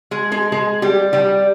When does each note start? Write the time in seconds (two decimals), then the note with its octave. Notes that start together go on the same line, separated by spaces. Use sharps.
0.11 G#3 G#4
0.32 G#3 G#4
0.52 G#3 G#4
0.82 G3 G4
1.13 G3 G4